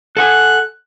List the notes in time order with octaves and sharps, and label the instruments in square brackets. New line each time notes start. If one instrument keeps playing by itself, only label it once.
[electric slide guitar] A4 F#5 G#5 [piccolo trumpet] F#6